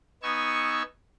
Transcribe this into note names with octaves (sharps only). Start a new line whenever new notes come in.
B3 D#4 G#5 C#6 E6